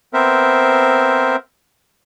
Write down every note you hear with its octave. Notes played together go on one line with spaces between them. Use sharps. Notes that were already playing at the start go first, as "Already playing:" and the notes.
B3 C4 A#4 C5 E5